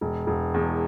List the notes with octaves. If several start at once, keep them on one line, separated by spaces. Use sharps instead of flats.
E1
E1
E2